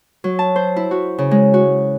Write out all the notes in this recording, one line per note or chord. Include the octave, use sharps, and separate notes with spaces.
F#3
A5
C5
E4
F#4
C#3
G#3
F#4